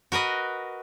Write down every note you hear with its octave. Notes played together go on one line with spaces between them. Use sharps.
F#4 A#4 B4 D#5